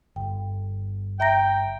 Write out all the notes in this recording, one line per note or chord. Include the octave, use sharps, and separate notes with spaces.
G1 G5
E5 G5 A#5 A#6